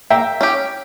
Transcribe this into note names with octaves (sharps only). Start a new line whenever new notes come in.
A#3 E5 G5
C#4 G4